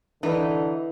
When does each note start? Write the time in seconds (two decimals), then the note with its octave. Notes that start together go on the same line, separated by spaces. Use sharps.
0.23 D3 E3 D#4 E4 B4